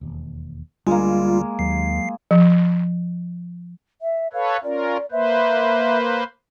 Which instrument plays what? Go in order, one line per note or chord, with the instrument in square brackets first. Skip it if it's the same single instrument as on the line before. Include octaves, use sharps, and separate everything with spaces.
[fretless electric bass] E1 D#2
[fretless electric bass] D2 C4 D4 [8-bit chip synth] G3 [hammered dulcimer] G#3 A#3 [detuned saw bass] F4
[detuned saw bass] D#2 [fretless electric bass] F#3 [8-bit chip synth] C7
[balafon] F3
[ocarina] E5
[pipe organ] A4 B4 C#5 [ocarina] F5
[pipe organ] C#4 F4 A#4 [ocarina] D5
[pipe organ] A#3 B4 C5 [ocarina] E5